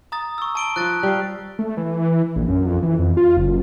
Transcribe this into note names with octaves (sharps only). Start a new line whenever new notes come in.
A#5 D#6 A6
C#6 E6
A5 D7 G7
F3 F4 F#6 A6
G3 F5
A3
E3
A#1
F#2
F2
E3
F2
F4
F#1